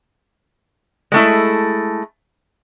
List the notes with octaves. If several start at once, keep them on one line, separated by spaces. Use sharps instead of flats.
G#3 A3 E4